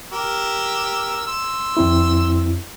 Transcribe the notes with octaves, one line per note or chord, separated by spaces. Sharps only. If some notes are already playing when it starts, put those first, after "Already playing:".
G4 A#4 E6
C6 E6
F2 C4 E4